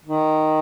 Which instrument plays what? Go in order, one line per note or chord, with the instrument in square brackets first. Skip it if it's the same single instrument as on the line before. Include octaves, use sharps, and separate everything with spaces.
[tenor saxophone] D#3